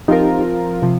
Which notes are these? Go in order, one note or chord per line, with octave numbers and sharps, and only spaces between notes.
F3 C4 D#4 F4 G4 A#4
C3 F3